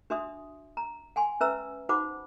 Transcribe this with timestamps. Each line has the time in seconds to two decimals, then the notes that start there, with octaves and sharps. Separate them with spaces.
0.10 D4 F#4 E5 C6 D#6
0.77 A#5
1.16 F#5 G#5 C6
1.40 C#4 B4 E5 A#5 E6
1.89 D#4 F#4 C5 F#5 B5 D6